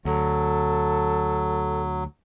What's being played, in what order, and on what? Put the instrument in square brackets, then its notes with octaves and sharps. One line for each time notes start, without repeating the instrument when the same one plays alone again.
[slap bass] D2 [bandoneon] F#3 [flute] A4